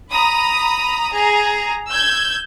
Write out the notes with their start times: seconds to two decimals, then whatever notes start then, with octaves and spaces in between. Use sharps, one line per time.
0.11 A#5 B5 D#6
1.10 G#4 A#5
1.90 E6 G6 G#6